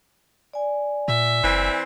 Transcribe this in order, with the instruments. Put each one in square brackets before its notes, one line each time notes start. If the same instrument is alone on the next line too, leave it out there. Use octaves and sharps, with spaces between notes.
[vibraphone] D5 G#5
[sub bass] A#2 [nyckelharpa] E5
[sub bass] F#1 [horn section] E3 C4